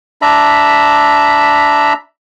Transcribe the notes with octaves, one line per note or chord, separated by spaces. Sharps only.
D4 E5 A#5 B5